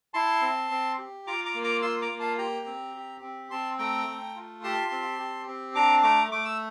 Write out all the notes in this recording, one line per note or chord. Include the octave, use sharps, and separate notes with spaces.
E4 A5 C6
C4
C4
G4
F4 A#5 D6
A#5 D6
A#3
A#5 D6
F4 C6 E6
A#5 D6
A#3
F5 A5
G4 G5 A#5
C4
G4
C4
C4 A5 C6
A3 G5 A#5
A3
F4
G4 A5 C6
C4
G4
C4
D4 A#5 D6
A3 A#5 D6
A3 D6
E6